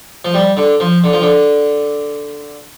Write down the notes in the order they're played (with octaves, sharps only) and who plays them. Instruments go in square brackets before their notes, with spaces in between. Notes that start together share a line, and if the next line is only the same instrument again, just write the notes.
[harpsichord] F3
G3
D3
F3
D3
F3
D3